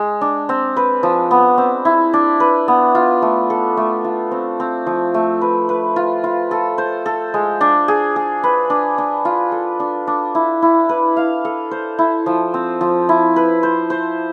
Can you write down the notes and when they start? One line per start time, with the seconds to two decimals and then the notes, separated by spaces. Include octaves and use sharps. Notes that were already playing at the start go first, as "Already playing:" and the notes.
Already playing: G#3
0.21 D4
0.49 C4
0.76 B4
1.03 F3
1.31 B3
1.58 C4
1.85 E4
2.14 D4
2.40 B4
2.68 B3
2.95 F4
3.22 A3
3.50 A4
3.77 A3
4.04 F4
4.31 C4
4.60 C4
4.86 F3
5.14 A3
5.41 B4
5.69 B4
5.96 F4
6.24 F4
6.51 A4
6.78 C5
7.06 A4
7.34 G#3
7.61 D4
7.88 G#4
8.16 G#4
8.43 B4
8.70 D4
8.98 D4
9.25 F4
9.52 A4
9.80 D4
10.07 D4
10.35 E4
10.62 E4
10.89 B4
11.17 F5
11.45 A4
11.71 C5
11.99 E4
12.26 F3
12.54 C4
12.81 F3
13.09 E4
13.36 B4
13.63 C5
13.90 C5